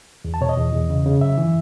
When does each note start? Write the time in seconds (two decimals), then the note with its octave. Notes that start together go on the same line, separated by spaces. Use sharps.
0.25 E2
0.34 A5
0.41 B2 C#5
0.49 D#5
0.57 E2
0.73 E2
0.90 C#3
1.06 C#3
1.21 F#2 E5
1.38 E3